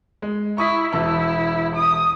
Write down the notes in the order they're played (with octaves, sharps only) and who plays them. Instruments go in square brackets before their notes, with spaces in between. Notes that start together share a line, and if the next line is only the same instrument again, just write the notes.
[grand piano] G#3
[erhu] E4 [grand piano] C#6 D#6 B6
[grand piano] E1 A5 E6 [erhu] E4
[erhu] D#6